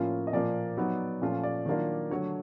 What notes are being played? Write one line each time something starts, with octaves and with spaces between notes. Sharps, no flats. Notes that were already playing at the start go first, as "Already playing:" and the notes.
Already playing: A2 F3 A#3 C#4 F4
D#5
A#2 F3 A#3 D5
F#3 B3 D#4
A#2 F3 A3 C#4 F4
D5
D#3 F#3 A#3 D4 F4
D3 F#3 A3 C#5